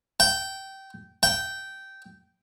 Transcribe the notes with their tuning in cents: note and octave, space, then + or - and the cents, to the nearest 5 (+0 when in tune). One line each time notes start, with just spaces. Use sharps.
G5 -20
G5 -15